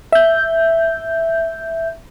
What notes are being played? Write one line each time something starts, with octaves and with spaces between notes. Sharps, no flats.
E5 G6